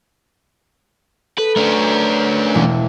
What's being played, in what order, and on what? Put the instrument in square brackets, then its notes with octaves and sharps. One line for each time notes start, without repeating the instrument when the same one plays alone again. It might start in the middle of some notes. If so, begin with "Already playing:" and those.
[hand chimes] A4 [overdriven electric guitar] B4
[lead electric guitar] A3 D4 [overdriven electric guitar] C#4 A#4 [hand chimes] B4
[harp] E1